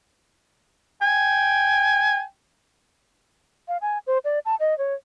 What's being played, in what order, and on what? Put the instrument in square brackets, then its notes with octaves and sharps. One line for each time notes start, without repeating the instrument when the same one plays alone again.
[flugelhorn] G5 [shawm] G#5
[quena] F5
G#5
C5
D5
A5
D#5
C#5